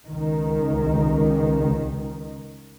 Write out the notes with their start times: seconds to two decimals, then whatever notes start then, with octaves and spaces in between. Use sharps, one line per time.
0.10 C#2 D#3